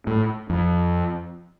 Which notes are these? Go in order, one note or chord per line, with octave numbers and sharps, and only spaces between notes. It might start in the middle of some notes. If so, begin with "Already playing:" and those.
A2
F2